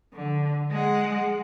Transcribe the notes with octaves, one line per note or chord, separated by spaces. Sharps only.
D3
G#3 F#5